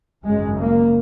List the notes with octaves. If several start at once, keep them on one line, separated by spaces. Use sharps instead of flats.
G#1 F#2 C#3 G#3
A#3